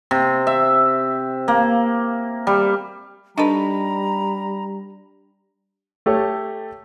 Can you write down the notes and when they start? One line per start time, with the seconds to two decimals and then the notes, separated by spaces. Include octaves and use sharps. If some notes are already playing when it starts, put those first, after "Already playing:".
0.11 C3
0.47 E5
1.48 A#3
2.47 G3
3.38 G3 D4 D#4 A4 B4 A#5 B5
6.06 A3 G4 A4 C#5